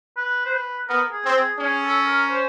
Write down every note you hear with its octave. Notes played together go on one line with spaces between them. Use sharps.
B4
C5
B4
B3 A#4
G#4
C4
G#4
C#4 G#4
A4
A#4
C5